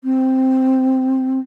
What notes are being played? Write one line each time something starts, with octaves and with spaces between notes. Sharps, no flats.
C4